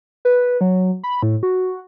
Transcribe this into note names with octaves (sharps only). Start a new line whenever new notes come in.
B4
F#3
B5
A2
F#4